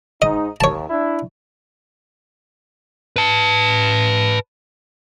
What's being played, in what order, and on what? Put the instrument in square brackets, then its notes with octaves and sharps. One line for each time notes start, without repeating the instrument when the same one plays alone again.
[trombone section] G#2 D#4 [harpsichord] D#5
[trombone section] D#2 [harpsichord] C#5 A5
[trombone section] D4 E4
[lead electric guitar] B4 A5